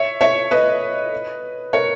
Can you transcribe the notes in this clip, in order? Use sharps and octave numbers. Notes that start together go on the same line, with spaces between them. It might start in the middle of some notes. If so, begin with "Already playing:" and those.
Already playing: C#5 E5
C#5 E5
B4 D#5
A#4 C#5